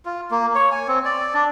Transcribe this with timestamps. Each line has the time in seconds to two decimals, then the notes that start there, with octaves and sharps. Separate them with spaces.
0.05 F4
0.31 A#3
0.55 C#5
0.72 G#5
0.88 C4
1.05 D5
1.34 D4